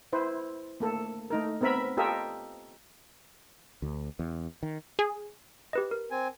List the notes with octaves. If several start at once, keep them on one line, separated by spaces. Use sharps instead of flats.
E4 B4 C5
A3 A#3 A4
A3 D#4 A#4
B3 C4 A#4 E5 B5
F4 G4 A4 A#4 D#5 E5
D2
E2
D#3
G#4
G4 B4 D#5
A#4
C4 G#5